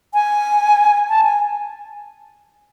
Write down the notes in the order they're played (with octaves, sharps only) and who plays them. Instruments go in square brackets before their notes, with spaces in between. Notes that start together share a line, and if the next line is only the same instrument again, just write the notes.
[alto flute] G#5
A5
G#5